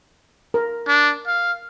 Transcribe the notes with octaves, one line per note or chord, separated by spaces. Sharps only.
A#4
D4
F5